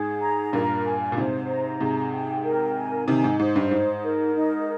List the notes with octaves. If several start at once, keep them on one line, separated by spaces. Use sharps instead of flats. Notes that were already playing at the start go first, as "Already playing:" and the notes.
Already playing: G#2 G#4
A#5
G2 A#2 A#4
G#5
A#2
G#2 C3 C5
A#5
G#2 C3 G#4
G5
A#4
G#5
C3 D#3 D#4
G#2
G#2 C5
G2
G#2 D#4
A#4
D#4